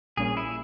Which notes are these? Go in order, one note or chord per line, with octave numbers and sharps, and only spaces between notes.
A#1 A#2 G3 A#3 C#4 G#4
E4